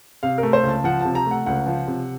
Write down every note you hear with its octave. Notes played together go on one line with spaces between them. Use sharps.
C3 F5
A#4
A3
C5
C#2
A5
F3 F#5
C3 A5
A#5
A3 F#5
C#2 F#5
F3
C3